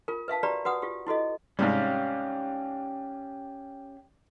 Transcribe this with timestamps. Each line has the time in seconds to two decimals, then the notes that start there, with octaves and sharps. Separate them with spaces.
0.08 F4 A#4
0.28 B4 E5 F5 A5
0.43 F#4 G4 B4 D5 A#5 B5
0.65 F#4 B4 F#5 D#6
0.82 F4 G4
1.07 E4 F#4 A4 D#5
1.59 G#2 C3 G3 C#4 G4 F5